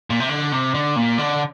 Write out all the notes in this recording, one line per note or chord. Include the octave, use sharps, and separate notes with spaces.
A#2
C3
D3
C3
D3
A#2
D3